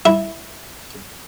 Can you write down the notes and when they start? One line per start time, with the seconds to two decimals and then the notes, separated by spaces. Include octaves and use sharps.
0.05 E4